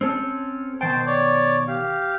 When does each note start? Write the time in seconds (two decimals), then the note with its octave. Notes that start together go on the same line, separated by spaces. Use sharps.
0.01 C4 C#4 A4
0.81 B2 D#3 C5 G5 A5 C6
1.06 C#5 D5
1.68 G4 F5